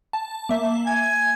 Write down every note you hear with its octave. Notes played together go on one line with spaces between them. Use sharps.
A5
A#3 E5
G#5 G#6